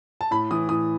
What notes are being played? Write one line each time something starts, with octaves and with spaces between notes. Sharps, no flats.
A5
A2 B5
E3 D#6
A2 D#6